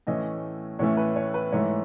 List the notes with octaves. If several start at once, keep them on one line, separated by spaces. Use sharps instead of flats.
A2 E3 A3 C#4 D#5
A2 E3 A3 C#4 C#5
B4
C#5
B4
G#2 E3 A3 C#5